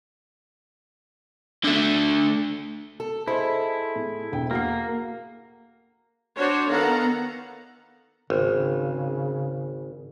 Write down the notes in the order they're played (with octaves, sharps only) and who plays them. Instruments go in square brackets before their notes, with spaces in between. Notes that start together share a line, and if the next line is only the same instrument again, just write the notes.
[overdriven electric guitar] D3 A3
[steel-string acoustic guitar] A4
[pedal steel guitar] E4 [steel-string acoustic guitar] G#4 A4 [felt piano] C5 D#5 C6
[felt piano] A2
E1 A2 G5
[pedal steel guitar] A#3 [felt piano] F#4 F#5 C7
[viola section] D4 F#4 C5 C#5
D#3 B3 A4 F5 F#5 A#5
[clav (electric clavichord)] G#1 [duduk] C#3